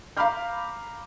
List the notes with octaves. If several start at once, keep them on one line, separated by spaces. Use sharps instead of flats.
F5 A#5 B5 D6 F6 G6